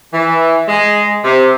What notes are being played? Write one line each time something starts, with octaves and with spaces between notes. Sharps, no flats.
E3
G#3
C3